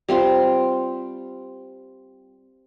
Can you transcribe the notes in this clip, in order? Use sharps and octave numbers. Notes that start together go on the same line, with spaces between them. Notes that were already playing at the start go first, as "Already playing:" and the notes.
G3 C4 F4 C5